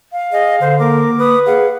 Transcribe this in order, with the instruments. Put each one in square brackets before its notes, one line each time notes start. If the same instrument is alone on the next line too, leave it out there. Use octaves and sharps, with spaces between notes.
[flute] F5
[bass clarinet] G#4 [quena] D#5
[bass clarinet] D3 [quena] C5
[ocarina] A#3 [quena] A#4 [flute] D6
[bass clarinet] B4 [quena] D#6
[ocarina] G#4 [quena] F5 [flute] F#5